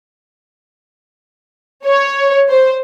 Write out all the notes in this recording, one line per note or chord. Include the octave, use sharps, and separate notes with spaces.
C#5
C5